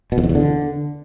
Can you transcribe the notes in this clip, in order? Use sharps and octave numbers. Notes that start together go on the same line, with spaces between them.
B2
E2
F2
E2
D3